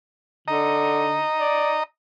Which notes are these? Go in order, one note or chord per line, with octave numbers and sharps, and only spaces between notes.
D3 D#5 A#5
D5